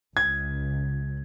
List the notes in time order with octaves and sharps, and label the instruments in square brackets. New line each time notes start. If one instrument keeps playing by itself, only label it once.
[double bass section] C#2 [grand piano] G#6